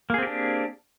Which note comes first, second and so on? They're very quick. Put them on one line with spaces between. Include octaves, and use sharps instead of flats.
A#3 G#4 C4 G4 D4